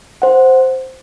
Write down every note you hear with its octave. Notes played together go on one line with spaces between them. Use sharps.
C5 F#5